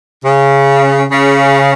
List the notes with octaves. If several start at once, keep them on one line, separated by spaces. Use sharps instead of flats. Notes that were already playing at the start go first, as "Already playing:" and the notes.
C#3
C#3